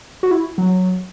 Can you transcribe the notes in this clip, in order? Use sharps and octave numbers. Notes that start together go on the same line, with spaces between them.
F#4
E4
F#3